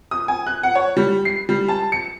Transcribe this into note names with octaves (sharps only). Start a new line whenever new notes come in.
D#6
G#5
F#6
F#5
C#5
G3
C7
G3
A5
C#7